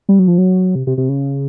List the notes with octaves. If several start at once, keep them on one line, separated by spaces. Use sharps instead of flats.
G3
F#3
F3
F#3
C3
C3
C3
C#3